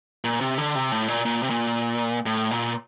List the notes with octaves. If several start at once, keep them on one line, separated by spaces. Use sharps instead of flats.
A#2
C3
D3
C3
A2
A#2
A#2
C3
A#2
A2
A#2